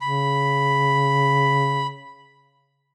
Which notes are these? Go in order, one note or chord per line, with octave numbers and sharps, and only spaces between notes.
C#3 B5